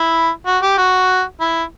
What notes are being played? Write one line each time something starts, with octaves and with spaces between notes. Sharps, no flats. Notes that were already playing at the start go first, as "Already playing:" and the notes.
Already playing: E4
F#4
G4
F#4
E4